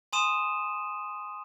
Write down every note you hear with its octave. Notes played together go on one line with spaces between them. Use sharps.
G#5 B5 C6 D#6 D#7 E7